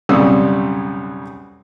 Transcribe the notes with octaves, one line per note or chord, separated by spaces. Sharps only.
B1 F2 C#3 G3 D#6 E6